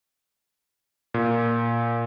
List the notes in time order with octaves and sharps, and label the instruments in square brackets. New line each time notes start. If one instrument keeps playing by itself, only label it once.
[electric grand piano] A#2